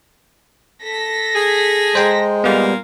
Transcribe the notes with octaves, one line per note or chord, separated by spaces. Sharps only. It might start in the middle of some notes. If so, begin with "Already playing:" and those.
A4 A#6 B6
G#4
G#3 C5 G5 A#5
A#2 G3 B3 A#4 F5